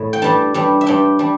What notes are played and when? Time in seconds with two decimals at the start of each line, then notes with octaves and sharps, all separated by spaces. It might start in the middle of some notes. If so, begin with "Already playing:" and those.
Already playing: A2
0.13 G5
0.22 G2 G3 D4 A5
0.54 G2 G3 D4
0.81 E5
0.86 G2 G3 D4 G5
1.19 G3 D4